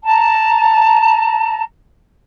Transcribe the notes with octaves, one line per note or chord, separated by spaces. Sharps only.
A5 A#5